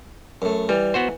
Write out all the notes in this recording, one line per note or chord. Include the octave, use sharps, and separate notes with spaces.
F#2 A3
E3 G3
B3 F#4 C5